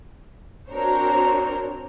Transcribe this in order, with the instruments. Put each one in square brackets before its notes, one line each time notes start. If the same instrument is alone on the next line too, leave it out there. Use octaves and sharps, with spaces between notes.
[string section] C4 D4 F#4 A#4 C5 C#5